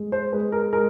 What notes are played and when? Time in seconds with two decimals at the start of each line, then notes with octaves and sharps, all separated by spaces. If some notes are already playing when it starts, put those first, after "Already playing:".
Already playing: G#3
0.12 C5
0.32 G#3 B4
0.52 A#4
0.73 G#3 A#4